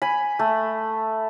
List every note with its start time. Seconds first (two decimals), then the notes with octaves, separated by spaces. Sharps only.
0.02 G#5 B5
0.39 A3